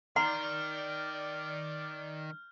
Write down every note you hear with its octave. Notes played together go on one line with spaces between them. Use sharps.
D#3 D5 F#5 A#5 C6 F6 G6